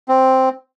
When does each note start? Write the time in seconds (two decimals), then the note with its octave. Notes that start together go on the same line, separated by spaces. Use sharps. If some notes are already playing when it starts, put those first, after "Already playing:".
0.09 C4